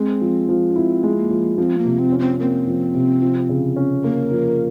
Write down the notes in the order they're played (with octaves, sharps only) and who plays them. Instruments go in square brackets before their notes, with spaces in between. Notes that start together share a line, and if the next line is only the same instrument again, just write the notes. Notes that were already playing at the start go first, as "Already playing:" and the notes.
Already playing: [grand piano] G#3 [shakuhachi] C4
[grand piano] F3
F3
[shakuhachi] C#4
[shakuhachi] C4 [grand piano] E4
[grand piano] G#3
[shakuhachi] A#3
[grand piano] F3
[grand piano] F3 [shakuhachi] C4
[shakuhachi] A#3
[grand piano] C3
[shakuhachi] C4
[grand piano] C#4
[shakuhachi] C4
[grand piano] A#3 [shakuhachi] C4
[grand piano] F3
C3
F3
C#3
C#4
[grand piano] A#3 [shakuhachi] A#4
[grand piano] F3